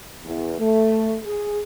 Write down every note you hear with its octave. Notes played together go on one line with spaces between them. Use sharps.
E2
A3
G#4